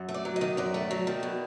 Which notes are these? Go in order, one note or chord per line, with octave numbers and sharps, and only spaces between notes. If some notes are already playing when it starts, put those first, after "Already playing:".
Already playing: F#2
A3
D5
F#3
D#5
D#3
F#2 D5
A3
F#3
D#3
B2